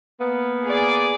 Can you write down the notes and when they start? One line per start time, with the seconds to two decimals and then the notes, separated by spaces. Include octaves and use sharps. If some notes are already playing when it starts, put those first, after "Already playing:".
0.21 A#3 B3
0.66 G#4 D5